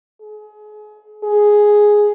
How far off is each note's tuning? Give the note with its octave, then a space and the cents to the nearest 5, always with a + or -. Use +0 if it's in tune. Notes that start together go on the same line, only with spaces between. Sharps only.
G#4 +30
G#4 +0